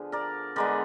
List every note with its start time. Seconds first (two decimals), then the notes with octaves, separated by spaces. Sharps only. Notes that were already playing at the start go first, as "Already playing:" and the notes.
Already playing: D3 F3 B3 G#4
0.12 A#4 D5
0.56 D3 G#3 B3 A#4 D5